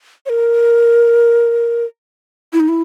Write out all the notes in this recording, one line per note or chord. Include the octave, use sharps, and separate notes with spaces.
C#5
A#4
E4
D#4
E4